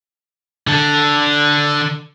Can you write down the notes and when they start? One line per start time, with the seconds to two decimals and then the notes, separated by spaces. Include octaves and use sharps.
0.67 D3 A4